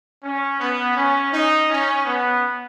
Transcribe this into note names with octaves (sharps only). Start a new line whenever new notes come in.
C#4
B3
C#4
D#4
C#4
B3